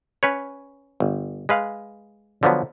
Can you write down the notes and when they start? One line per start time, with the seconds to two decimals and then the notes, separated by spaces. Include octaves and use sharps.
0.23 C#4 B4 C#5
1.00 G1
1.49 G#3 B4 F5
2.43 D3 F3 F#3 B3